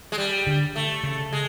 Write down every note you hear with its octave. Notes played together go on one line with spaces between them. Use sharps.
G#3
G3
D3
A3
C#3
G#3